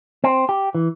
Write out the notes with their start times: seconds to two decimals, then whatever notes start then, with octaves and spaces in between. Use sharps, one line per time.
0.24 C4
0.49 G4
0.75 E3